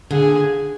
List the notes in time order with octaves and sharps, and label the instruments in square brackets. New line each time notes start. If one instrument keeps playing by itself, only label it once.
[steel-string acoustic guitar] A#2 D3 [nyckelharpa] G#4